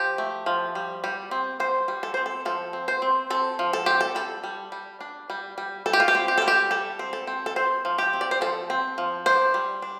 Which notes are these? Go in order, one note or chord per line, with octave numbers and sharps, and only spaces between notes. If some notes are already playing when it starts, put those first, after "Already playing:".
Already playing: F3 G4
A3
F3
G3
G3
C4
G3 C5
G3
A4
C4 C5
A4
F3 A4
C4
C5
C4
C4 A4
F3
A4
C4 G4
A4
G3 A4
G3
G3
D4
G3
G3
G3 A4
G4
F4
G4
C4
G4
G3 A4
G4
G3 A4
C4
A4
C4
A4
C4 C5
F3
G4
C4
D5
C5
F3 A4
C4
F3
D4 C5
G3
D4